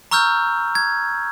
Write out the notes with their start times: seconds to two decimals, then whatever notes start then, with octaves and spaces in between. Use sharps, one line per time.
0.11 A#5 C#6 E6 F6 G6
0.75 G#6